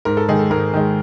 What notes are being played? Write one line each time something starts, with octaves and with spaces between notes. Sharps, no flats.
G#2 A#4
A4
D#3 G#3 G#4
A4
G#2 A#4
D#3 G#3